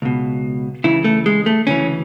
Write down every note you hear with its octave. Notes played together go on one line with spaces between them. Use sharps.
C#2 B2
C#2 C#3 E3 E4
A3
G#3
A3
D2 C#3 E3 C#4